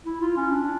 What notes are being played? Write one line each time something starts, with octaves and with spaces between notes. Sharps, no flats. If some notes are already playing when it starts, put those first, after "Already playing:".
E4
F4
C#4
D4